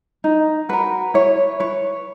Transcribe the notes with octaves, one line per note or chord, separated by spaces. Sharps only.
D#4
F#4 A#4 B4
E4 C#5
B4 C#5